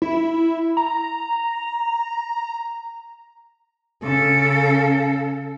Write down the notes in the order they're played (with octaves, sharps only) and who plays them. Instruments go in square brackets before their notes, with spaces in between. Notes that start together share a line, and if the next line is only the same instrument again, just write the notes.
[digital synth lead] E4
A#5
[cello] C#3 A4